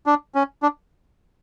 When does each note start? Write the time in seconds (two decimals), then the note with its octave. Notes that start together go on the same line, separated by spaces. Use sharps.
0.06 D4
0.35 C#4
0.63 D4